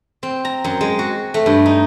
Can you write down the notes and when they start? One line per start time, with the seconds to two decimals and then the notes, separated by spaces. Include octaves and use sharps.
0.23 C4
0.45 A#5
0.64 F#2
0.81 G#3
0.99 F#4
1.34 A3
1.46 G2
1.66 D#4